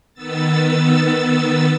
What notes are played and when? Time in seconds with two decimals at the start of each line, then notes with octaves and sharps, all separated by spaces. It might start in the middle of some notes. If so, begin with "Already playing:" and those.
0.14 D#3 B3 E6 A6